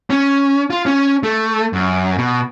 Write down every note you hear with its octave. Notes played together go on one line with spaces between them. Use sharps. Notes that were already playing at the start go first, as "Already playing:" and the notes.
C#4
F4
C#4
A3
F#2
B2